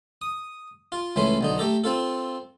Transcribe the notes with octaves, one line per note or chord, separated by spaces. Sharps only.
D#6
F4
C#2 E3 A3 C#4 C6
B1 D3 D#4
A3 G4 A4 A#5
C4 F4 A4